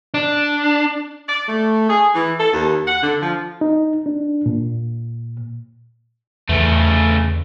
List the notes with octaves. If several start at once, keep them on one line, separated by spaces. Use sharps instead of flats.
D4
D5
A3
G#4
E3
A4
D#2
F#5
D3
F3
D#4
D4
A#2
E2 C#3 A3